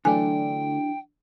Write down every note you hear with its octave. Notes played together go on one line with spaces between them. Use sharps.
D3 E3 F#3 A3 D4 G5 G#5